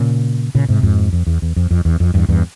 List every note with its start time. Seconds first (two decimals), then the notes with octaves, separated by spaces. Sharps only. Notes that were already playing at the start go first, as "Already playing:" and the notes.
Already playing: A#2 C#3
0.55 A#2 C#3
0.69 G#2 C3
0.83 F2 G#2
1.13 F2
1.27 E2
1.42 E2
1.56 F2
1.71 F2
1.85 E2
2.00 F2
2.14 E2 G2
2.29 E2 G2